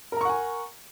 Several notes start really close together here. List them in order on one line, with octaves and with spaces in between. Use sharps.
A#4 A#5 C#6 F#5 G#5